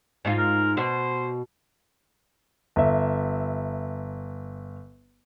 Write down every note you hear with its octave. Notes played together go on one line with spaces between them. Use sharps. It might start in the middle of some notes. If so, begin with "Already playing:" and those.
G#2 D#4 F4
A#4
B2 C5
G1 E5